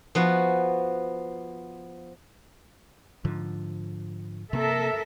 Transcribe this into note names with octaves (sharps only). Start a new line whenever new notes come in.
F3 B3 F#4
G#2 D3 F3
C3 A#3 A4 A#4 E5